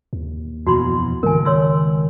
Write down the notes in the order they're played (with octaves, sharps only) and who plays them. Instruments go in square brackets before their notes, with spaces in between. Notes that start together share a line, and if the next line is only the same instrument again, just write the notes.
[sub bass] D#2
[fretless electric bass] F2 B2 E3 [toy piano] F#4 B5 C6
[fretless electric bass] C#2 G#2 [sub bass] D#3 [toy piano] A#4 G#5
[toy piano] C#5 C6 E6